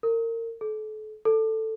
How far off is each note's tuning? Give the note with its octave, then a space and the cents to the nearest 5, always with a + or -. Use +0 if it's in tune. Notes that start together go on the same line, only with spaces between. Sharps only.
A#4 -30
A4 -35
A4 +5